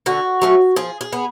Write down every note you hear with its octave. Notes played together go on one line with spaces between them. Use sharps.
D3 F#4
F#3 A3 C#4
F3 G#4
G#4
B3